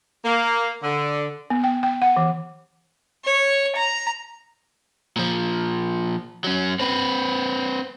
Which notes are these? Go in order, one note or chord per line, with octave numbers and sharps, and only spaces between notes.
A#3
D3
B3
G5
G5
F#5
E3
C#5
A#5
A#2 F3
F#3 C#4
C4 B4